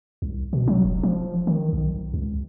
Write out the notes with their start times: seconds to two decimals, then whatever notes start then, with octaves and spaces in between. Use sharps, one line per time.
0.22 C2
0.53 B2
0.68 F#3
0.84 F1
1.03 F3
1.47 D#3
1.73 B1
2.14 C#2